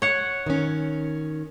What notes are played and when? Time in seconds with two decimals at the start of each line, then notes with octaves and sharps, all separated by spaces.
0.02 C#5 F#5
0.46 D#3 C#4